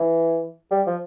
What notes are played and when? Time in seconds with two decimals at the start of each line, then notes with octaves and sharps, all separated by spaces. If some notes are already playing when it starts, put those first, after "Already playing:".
Already playing: E3
0.71 G3
0.87 F3